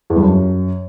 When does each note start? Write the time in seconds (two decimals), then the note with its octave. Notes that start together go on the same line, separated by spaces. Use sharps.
0.10 E2
0.16 G2
0.23 F#2